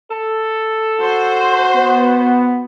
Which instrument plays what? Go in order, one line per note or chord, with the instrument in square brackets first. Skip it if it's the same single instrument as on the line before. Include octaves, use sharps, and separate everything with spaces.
[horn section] A4
[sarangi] F#4 [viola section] C5
[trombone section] B3